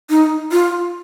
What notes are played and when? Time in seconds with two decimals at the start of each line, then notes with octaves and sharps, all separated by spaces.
0.10 D#4
0.52 F4